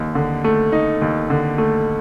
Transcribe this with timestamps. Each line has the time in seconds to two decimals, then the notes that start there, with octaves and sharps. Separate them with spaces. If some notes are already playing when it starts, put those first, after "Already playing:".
Already playing: D#2 D#4
0.15 D3
0.44 A3
0.72 D#4
1.02 D#2
1.30 D3
1.58 A3